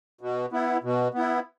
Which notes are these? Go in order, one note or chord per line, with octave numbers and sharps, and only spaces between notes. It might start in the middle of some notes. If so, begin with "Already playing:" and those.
B2
B3 E4
B2
B3 E4